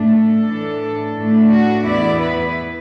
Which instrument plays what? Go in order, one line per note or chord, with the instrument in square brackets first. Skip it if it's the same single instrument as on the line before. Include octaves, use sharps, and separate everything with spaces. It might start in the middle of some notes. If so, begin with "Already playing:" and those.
Already playing: [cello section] A2 A3 D4
A4
A2 E3 D4
A2 A3 D4
F#4
E2 E3 B3 E4 D5
B4